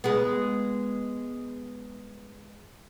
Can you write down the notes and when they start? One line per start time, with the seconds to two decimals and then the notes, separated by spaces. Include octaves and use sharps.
0.04 G#3 B3